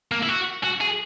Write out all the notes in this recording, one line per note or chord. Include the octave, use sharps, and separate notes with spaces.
A#3
E4
F#4
F#4
G#4